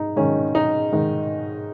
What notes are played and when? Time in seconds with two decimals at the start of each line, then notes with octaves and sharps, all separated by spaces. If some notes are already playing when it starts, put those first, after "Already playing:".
Already playing: G#2 D#4
0.16 G#2 D#3 C#4
0.55 D#4
0.92 G#2 D#3